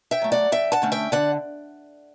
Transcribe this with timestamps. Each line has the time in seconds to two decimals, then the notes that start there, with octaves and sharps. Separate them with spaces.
0.11 E5 G5
0.22 F#3 A3
0.32 D5 F#5
0.52 G2 E5 G5
0.72 F#5 A5
0.82 D3 A3 C#4
0.92 E5 G5
1.12 D3 D5 F#5